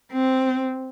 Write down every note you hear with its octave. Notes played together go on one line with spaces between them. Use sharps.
C4